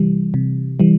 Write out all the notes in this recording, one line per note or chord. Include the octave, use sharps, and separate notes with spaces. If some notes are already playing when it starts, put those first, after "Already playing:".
Already playing: C3 E3 G3
C3
E3 G3